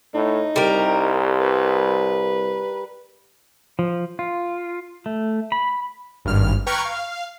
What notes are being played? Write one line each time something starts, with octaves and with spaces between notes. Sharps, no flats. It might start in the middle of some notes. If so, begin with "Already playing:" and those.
A2 D#4
C2 G3 A#4
B4
F3
F4
A3
B5
G#1 G2 F6
B4 G5 A#5 C#6 F6 G#6
F5